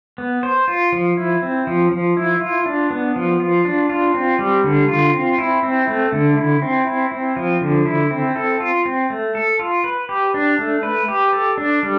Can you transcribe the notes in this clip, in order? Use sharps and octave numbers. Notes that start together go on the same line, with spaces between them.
B3
C5
F4
F3
E4
C4
F3
F3
E4
F4
D4
B3
F3
F4
D4
F4
C4
G3
D3
F4
C4
E4
C4
A3
D3
E4
C4
E4
C4
F3
D3
E4
C4
A4
F4
C4
A3
A4
F4
B4
G4
D4
A3
B4
G4
A4
D4
G3